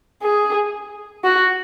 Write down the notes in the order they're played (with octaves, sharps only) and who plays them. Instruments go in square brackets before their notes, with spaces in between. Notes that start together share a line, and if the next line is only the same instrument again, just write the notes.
[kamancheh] G#4
F#4